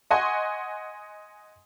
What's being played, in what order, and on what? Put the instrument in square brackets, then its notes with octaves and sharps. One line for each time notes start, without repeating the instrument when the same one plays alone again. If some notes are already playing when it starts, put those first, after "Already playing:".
[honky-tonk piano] D#5 F#5 G#5 C6 C#6